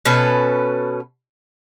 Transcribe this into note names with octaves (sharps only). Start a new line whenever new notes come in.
B2 C#4 A4 B4